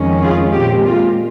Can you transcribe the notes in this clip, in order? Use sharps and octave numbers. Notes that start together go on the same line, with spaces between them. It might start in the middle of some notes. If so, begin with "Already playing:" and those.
Already playing: F2 D#3 G#3 C#4
F4 G#4
A#2 G#3 C4 G4
F4